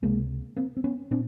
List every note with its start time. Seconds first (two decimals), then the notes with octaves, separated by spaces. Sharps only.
0.02 C#2 C3 G#3 A#3
0.56 A#3 C4
0.77 C4
0.84 B3 C#4
1.11 A#2 C4 D4